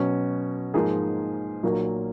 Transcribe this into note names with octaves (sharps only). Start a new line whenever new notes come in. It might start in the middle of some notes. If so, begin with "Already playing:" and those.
Already playing: B2 F#3 C#4
G#2 F3 A#3 D#4 G#4
B1 A#2 F#3 A#3